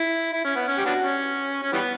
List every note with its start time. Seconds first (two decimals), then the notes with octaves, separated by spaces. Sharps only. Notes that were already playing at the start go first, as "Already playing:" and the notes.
Already playing: E4
0.33 E4
0.45 C#4
0.56 B3
0.68 C#4
0.78 G4
0.86 B3 D4 F#4
1.02 C#4
1.63 C#4
1.73 E3 G3 B3